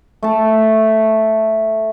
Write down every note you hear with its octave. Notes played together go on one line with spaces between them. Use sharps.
A3 A5